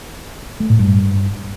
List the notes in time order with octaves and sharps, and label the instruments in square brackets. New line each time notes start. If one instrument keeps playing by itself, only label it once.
[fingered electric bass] A3
A2
G2